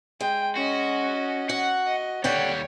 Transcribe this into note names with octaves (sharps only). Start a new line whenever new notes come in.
G#3 G5
C#4 F#4 D#5
F#4 F#5
D#5
D#2 D3 G3 C#5 F#5 G5